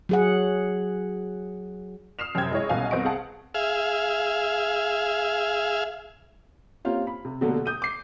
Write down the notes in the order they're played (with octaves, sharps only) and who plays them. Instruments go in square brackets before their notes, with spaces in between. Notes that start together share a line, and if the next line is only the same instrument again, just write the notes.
[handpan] F#3 G#4 F#5
[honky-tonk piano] D#6 F6 C7 E7 F7
F#2 C3 C4 G5 G#6
G#3 E4 G#4 C#5 D#5
C2 B2 C#4 F5 G#5
C2 B3 C4 D#5 C#6 D7
G#4 F5 F#5 A5
[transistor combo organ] G#4 E5 F5
[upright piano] A#3 C4 C#4 F4 G4
B5
C3
B2 D3 F#3 A3 A#3 G4
D#6 G6 D#7
D6 C7